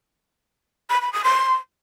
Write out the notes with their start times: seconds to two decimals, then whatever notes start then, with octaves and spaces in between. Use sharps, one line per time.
0.89 B5
1.01 B5
1.12 D#6
1.24 C6